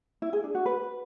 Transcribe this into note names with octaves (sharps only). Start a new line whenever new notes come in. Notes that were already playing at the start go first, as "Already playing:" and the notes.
E4
G#4
D4
F#4
B4